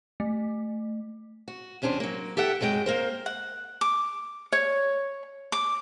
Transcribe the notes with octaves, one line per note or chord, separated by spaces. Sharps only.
A3
F#4
E2 C3 C#4 D4 C5
F#3 A#3
G4 A4 E5 F#5 G5
F#2 F#3 G#3 G#4 G5
A#3 A#4 C5
F#5
D6
C#5
D6